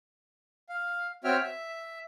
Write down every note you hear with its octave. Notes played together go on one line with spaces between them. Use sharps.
F5
C4 F#4 C#5 E5 G5 F6
E5